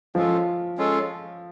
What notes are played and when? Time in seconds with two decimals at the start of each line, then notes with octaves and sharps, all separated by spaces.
0.15 F3 G#3 C#4 F4 A4
0.78 G#3 C#4 F4 A4